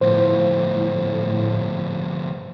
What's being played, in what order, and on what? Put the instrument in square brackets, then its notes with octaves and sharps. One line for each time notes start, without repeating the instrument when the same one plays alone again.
[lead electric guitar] D2 F3 [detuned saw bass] A2 [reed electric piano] C5